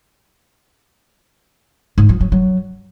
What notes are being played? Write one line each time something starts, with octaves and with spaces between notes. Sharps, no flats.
G#2
F3
F#3
F#3